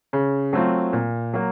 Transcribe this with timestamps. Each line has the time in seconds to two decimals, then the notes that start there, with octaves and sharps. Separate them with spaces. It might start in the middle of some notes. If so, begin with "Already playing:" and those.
0.13 C#3
0.53 F#3 A3 C4 F4
0.93 A#2
1.34 F#3 A#3